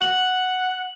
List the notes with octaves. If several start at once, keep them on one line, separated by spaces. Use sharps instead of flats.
F#5 F#7